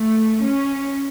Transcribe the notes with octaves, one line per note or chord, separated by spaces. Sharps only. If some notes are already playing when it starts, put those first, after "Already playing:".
Already playing: A3
C#4